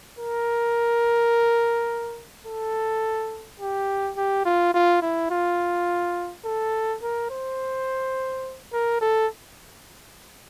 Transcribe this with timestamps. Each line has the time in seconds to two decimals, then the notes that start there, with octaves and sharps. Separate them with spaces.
0.19 A#4
2.46 A4
3.60 G4
4.17 G4
4.45 F4
4.74 F4
5.02 E4
5.31 F4
6.45 A4
7.02 A#4
7.30 C5
8.73 A#4
9.01 A4